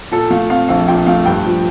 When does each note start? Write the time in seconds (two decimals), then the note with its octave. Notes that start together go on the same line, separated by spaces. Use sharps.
0.11 A#2 A4
0.30 A3 F5
0.50 C4 F5
0.69 A#1 F5
0.88 A#2 G5
1.06 A3 F5
1.26 G2 G5
1.45 F3